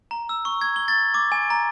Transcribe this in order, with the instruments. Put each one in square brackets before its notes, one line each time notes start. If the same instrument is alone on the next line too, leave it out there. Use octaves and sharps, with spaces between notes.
[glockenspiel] A#5
E6
C#6
G#6
G7
A6
D6
G#5
A#5